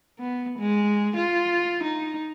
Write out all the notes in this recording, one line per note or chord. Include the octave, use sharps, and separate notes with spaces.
B3
G#3
F4
D#4